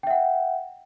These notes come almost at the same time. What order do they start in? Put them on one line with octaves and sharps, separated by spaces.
G5 E5 F#5